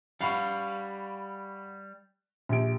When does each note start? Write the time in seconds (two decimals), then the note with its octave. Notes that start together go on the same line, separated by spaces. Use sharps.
0.21 G3 F5 F#5 B5 C#6
2.49 A#1 G4 D7